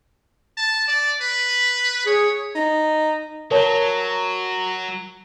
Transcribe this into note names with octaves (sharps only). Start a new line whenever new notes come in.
A5
D5
B4
G#4 C#5
D#4
F#3 A#4 C#5 A5